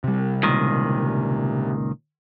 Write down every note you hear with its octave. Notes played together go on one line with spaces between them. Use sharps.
C3 G3
C#2 A#2 D#3